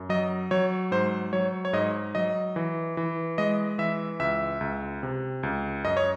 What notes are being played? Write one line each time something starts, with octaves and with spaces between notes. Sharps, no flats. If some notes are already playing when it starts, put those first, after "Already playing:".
Already playing: F#2
F#3 D#5
F#3 C#5
G#2 C5
F#3 C#5
C#5
G#2 D#5
F#3 D#5
E3
E3
G#3 D#5
E3 E5
C#2 E5
C#2
C3
C#2
F#2 D#5
C#5